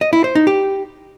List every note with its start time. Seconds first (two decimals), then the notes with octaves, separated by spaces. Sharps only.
0.01 D#5
0.13 E4
0.24 C5
0.35 D#4
0.47 G4